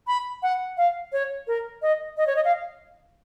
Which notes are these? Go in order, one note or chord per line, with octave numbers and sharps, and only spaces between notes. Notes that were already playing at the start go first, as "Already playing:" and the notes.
B5
F#5
F5
C#5
A#4
D#5
D#5
C#5
D#5
F5